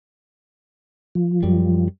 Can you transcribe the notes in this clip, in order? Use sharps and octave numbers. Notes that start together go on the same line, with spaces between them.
F3
F#2 G3